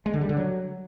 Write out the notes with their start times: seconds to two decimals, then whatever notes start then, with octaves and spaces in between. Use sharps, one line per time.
0.06 G#3
0.14 D3
0.21 G3
0.29 D3
0.37 F#3